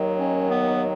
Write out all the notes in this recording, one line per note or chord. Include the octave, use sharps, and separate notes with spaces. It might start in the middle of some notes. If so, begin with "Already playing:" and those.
Already playing: D#2 D#3 F#3
C#4
B3